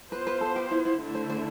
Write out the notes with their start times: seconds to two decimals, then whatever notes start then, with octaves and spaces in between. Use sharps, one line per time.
0.12 B3 F4 B4 C5
0.27 B4
0.41 A4
0.56 G4
0.71 E4
0.85 E4
0.99 D3 A3 E4
1.15 C5
1.30 C5